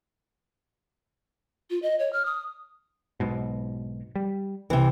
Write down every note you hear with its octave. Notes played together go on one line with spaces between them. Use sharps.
F4
D#5
C#5
F6
D#6
B1 G#2 B2
G3
D#1 C2 C3 E3